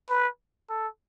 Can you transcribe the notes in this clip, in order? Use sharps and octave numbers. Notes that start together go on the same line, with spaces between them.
B4
A4